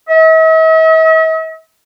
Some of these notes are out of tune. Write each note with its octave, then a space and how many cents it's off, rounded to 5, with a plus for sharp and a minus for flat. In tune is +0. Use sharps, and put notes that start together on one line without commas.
E5 -45